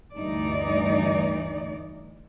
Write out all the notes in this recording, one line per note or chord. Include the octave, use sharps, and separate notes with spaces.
D2 G2 E3 D#4 D5